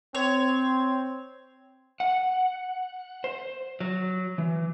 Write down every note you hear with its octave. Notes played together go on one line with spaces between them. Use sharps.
C4 C#5
F#5
C5
F#3
E3